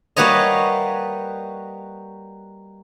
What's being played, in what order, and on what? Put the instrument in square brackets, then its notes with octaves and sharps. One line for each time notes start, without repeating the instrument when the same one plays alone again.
[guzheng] G3 A#3 F#4 B4 C#5 D#5